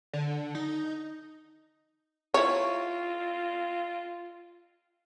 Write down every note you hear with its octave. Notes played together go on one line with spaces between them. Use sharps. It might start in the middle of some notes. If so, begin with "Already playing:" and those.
D3
D#4
E4 F4 C#5